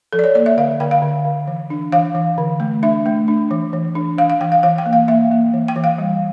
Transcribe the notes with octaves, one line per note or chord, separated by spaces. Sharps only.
F3 A4
D5
C#5
A#3 D5
E5
D3 F5
D3 G5
F5
D3
D3
E3
D4
E3 F5
E3
D3
A3
D4 E5
A3
D4
E3
E3
D4
E3 F5
F5
E3 G5
F5
E3 F5
G5
A#3
F5
A#3 E5
A#3
E3
G5
E3
F5
G3